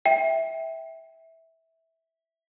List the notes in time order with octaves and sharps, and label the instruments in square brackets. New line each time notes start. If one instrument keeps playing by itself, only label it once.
[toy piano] E5 [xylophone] G5